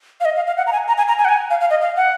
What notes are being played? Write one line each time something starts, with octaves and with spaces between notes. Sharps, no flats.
F5
D#5
F5
F5
F#5
A#5
G#5
A#5
G#5
A#5
G#5
F#5
G#5
F5
F5
D#5
F5
F#5